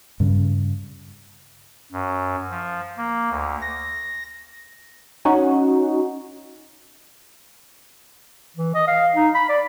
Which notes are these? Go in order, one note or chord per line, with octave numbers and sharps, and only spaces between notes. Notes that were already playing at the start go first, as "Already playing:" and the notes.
G2 C#3
F#2
F3
A#3
D2
A#6
C#4 D#4 F#4
E3
D#5
F5
D#4
B5
D5